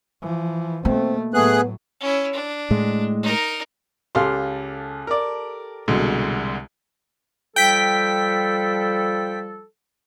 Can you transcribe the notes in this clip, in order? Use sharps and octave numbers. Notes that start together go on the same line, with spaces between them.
E3 F3
B2 A3 A#3 C4
A2 F#3 A3 B3 G#4 F#6
C#4 E4
D4
A2 G#3
D#4 A#4
C#2 G4 A4 F5 C6
A#4 D5
C2 B2 D3 G#3
F3 G3 A4 G5 B6